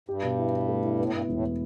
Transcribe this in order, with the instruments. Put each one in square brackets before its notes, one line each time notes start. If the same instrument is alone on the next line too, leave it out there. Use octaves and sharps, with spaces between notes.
[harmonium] G2 [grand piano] G4
[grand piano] B2
E4
E4
A3
E4
[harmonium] A2 [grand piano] B3
[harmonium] G2 [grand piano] B3
[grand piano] E1 [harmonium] A2